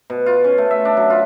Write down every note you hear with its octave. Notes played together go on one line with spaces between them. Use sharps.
B2
F4
C#4
A3
E5
D4
F#3
F4